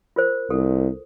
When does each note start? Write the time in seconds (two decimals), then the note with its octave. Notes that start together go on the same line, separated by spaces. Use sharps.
0.16 F4 A#4 C5
0.50 C2 A4